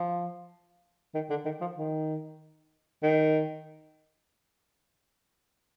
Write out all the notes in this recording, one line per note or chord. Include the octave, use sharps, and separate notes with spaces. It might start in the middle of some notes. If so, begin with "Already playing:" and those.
Already playing: F3
D#3
D3
D#3
F3
D#3
D#3